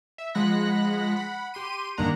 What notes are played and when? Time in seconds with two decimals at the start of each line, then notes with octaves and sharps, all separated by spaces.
0.18 E5
0.35 F3 G#3 F#5 B5 F#6 A#6
1.16 F#5 B5
1.54 G4 C6 D#7
1.98 G2 D#3 A#3 D4 F#5 A#5